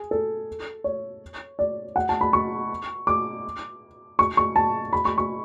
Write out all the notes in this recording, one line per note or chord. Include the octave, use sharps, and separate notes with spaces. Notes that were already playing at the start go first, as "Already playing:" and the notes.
Already playing: G#4
A4
C#5
D5
F#5
A5
B5
C#6
D6
C#6
C#6
A5
B5
C#6
C#6